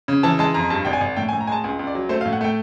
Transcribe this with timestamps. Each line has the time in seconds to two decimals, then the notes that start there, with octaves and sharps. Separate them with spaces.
0.08 C#3
0.23 E3 A5
0.39 G#3 A5
0.54 F2 A#5
0.70 G2 A5
0.85 G#1 G5
0.93 G#5
1.01 G#1
1.16 A2 G5
1.29 G#5
1.33 A2
1.41 A#5
1.47 G#3 G#5 A5
1.64 C#2 G#5
1.79 C#2
1.87 D5
1.95 F#3
2.09 A3 C5
2.21 F5
2.25 A2
2.33 F#5
2.41 A3 G5